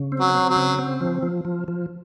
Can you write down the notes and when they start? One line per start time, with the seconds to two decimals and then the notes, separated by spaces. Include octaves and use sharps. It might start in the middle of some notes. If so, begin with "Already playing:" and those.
Already playing: C#3
0.12 C4
0.20 F#3
0.35 C4
0.49 F#3
0.56 C#3
0.79 C4
1.01 F3
1.23 F3
1.45 F3
1.68 F3